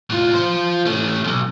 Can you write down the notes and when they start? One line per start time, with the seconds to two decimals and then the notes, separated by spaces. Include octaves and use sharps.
0.10 A2 F4
0.34 F4 C5
0.86 A3 C#4
1.24 B1 G#2